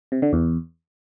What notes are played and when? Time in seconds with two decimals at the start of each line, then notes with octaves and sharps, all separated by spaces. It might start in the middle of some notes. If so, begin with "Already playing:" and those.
0.12 C3
0.22 D3
0.33 E2